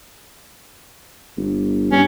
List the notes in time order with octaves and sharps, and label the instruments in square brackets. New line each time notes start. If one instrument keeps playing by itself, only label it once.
[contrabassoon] G1
[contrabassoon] G2 [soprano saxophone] C#4